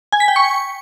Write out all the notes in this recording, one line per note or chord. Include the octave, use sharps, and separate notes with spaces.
G#5
B6
G5
C#6